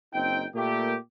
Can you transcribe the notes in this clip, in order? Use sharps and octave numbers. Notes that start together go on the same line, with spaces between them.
F#1 C4 D#4 G5
A#2 A3 A#3 G4